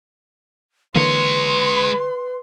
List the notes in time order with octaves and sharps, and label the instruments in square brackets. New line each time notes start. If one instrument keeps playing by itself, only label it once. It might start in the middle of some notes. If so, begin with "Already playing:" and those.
[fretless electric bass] D3 E3 A#3 [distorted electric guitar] G#3 C#5 [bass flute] B4 [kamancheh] C6